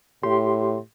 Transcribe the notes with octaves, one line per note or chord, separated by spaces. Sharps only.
A2 G4 C6